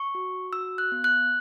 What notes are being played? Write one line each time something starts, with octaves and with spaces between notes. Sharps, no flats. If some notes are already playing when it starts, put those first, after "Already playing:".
Already playing: C#6
F#4
F#4 E6
F#6
B3
F#6